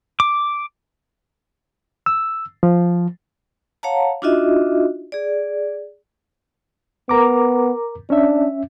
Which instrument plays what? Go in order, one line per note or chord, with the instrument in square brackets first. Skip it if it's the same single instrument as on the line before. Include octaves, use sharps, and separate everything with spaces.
[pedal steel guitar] D6
[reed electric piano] E6
F3
[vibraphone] C#5 F5 F#5 A5 A#5
D4 D#4 F4 F#4 D#5 E5
G#4 D5
[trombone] B3 [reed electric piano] A#4 A#5 D6
[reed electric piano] C#4 E5 [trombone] D4